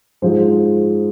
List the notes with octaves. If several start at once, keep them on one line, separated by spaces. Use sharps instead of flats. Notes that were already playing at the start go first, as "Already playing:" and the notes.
G#2 F3 G#3 C5